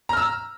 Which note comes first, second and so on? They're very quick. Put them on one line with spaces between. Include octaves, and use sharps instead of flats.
A#5 F6 E6